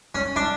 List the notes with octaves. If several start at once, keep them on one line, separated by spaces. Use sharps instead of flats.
C#4
D4